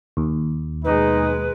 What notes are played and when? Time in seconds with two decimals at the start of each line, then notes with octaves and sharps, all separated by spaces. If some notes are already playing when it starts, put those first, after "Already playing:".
0.17 D#2
0.85 B2 G#3 D#4 B4